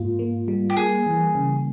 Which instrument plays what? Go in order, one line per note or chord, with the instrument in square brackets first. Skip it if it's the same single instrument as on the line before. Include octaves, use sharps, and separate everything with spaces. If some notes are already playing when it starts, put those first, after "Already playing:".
Already playing: [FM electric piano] G#2 A#3 F4
A#3
G3
[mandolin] G4
[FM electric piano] A#3 [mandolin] G#4
[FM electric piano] E3
C#3